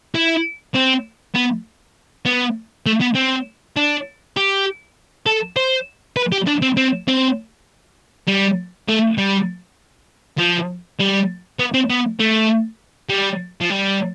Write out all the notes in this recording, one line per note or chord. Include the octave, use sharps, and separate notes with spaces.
E4
C4
B3
B3
A3
B3
C4
D4
G4
A4
C5
B4
G4
D4
C4
C4
C4
G3
A3
G3
F3
G3
B3
C4
B3
A3
G3
F3
G3